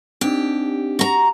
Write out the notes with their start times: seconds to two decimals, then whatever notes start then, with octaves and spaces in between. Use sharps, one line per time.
0.21 C4 D4 D#4 G4
0.99 F#4 A#5